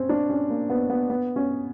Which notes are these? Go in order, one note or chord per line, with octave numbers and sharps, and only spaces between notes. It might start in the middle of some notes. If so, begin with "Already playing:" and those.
Already playing: C4 C#4
D4
C#4
A#3
B3
B3
B3
C#4